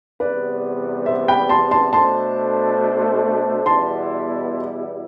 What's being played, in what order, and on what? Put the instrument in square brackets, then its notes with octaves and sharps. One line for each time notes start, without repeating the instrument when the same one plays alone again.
[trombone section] E2 C3 G3 B3 [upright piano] B4 D5
[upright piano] C5 E5
G5 B5
A5 C6
A5 C6
[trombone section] B2 A3 D4 A4 C5 [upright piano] A5 C6
[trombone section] E2 B2 G3 B3 E4 [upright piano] A5 C6